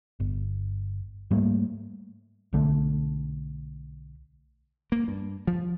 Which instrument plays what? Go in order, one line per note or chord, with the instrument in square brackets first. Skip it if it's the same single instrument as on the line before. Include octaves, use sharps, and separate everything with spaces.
[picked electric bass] G1
G#2 G3 A3 A#3
B1 D3 A3 D4
[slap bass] A#3
G2
F3